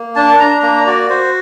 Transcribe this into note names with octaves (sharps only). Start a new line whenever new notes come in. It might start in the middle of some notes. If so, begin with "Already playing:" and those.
Already playing: A#3
D4 A5
D4 A#5
A#3 A#5
F#4 D5
F#4 C5